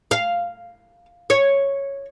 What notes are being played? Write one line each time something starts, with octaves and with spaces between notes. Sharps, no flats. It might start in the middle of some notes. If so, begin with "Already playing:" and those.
F5
C#5